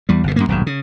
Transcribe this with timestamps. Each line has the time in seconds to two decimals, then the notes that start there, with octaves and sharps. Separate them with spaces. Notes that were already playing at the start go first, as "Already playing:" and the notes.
0.09 E2 G3
0.24 G1 B2
0.36 F#2 C3 A#3
0.48 D#1 B1 G#2
0.67 C#3